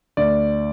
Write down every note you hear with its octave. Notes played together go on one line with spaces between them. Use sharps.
D2 D5